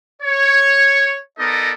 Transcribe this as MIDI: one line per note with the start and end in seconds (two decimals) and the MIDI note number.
0.22 1.18 73
1.39 1.72 59
1.39 1.72 63
1.39 1.72 69
1.39 1.72 70
1.39 1.72 74
1.39 1.72 75